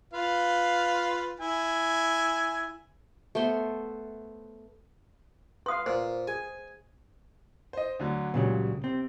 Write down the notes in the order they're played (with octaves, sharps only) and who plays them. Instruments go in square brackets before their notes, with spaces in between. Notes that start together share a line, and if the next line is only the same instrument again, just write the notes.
[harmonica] F4 B4 F5
E4 G#5
[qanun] A3 B3 C5 C6
[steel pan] B4 F5 [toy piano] C6 D#6
[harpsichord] A#2 [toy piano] C5
[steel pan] G#4 [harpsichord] G#5
[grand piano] C5 D#5
D2 D3 F#3
[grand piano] C#2 G3 [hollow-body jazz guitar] A#2 C#3 F#3
[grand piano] C3 [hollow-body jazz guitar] C4